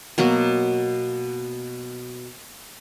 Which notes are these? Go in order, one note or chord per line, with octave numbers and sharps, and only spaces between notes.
B2 F#3 A#3 F#4